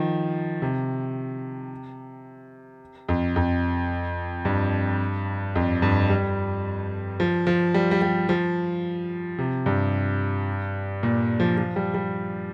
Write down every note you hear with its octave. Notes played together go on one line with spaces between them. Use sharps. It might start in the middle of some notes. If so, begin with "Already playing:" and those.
Already playing: D#3 F3
C3
F2
F2
G2
F2
G2
G3
F3
F3
G3
G3
G3
F3
C3
G2
A#2
F3
F3
G3
G3